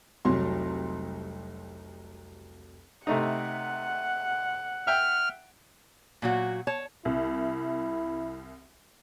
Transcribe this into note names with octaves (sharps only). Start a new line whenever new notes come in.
F1 C2 F#3 C6
C3 A3 D#4 F#5
E5 G5 F6
A#2 F#3 F#4
C#5 A5
C2 E4